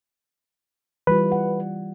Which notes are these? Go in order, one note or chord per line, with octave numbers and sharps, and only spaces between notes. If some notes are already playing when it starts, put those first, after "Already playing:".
E3 G3 F4 B4
F#5